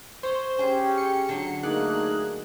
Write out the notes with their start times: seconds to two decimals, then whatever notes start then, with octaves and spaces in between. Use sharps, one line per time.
0.23 C5 C#5
0.59 C#4 G4 G#4 G5
0.98 C#7
1.29 D3 F#3
1.63 A3 A#3 D#4 G#4 D5 F#6